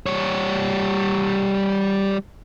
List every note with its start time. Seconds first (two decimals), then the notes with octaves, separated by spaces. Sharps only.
0.06 G3 C#5